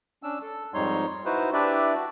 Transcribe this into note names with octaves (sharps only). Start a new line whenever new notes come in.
C#4 D4 E6
A4
F2 G#2 G3 D#4 C#5 C6
D#4 E4 F#4 B4 C5
D4 E4 G4 B4 D5 E5
F#4